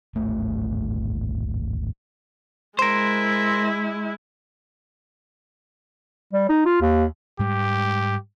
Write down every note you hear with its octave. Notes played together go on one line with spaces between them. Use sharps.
D1 G#1 A3
G#3 E4 A#4 C5
G3
D#4
F4
D#2
G#2 G3 G#3 G4